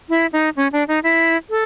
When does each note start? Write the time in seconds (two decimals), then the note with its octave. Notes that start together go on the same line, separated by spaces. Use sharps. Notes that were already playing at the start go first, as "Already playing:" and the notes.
0.09 E4
0.33 D#4
0.57 C#4
0.72 D4
0.88 D#4
1.03 E4
1.50 A4